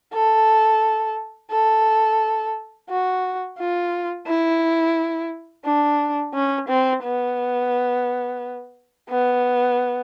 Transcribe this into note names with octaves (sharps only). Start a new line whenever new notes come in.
A4
A4
F#4
F4
E4
D4
C#4
C4
B3
B3